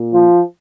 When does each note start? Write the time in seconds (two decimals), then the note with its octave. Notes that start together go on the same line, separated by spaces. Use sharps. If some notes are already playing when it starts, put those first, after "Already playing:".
Already playing: A#2
0.13 F3